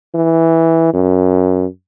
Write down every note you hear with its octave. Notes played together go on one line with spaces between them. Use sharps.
E3
F#2